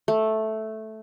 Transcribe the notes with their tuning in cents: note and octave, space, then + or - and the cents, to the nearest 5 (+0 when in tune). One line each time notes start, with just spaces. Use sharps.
A3 -5